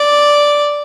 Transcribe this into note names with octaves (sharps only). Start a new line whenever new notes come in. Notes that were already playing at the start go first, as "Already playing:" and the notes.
Already playing: D5